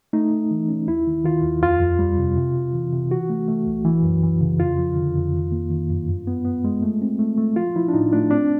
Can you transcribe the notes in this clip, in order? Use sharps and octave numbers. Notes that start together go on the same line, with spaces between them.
A3 D#4
A3
E3
C#4
D#2 E4
D#3
D#3 F4
D#2
F2 F4
F2
G3
C3
C3
C3
E3
C3
E3 F#4
A3
A3
C2
E3
F#2
E3
C#3
F2 F4
F3
D3
F2
D#3
A#3
D#3
F#2
G2
B3
B3
G#3
A3
C4
A3
A3
F3 F4
F3 E4
D4
A2 D#4
A3 D4
C4 D4